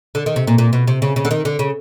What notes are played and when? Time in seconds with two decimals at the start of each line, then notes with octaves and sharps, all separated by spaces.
0.15 D3
0.26 D#3
0.36 C3
0.47 A#2
0.58 A#2
0.73 B2
0.87 C3
1.02 C#3
1.16 C#3
1.25 D3
1.31 D#3
1.45 D3
1.59 C#3